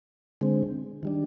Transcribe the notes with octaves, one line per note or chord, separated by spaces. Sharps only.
D3 G#3 C4
D#3 G3 D4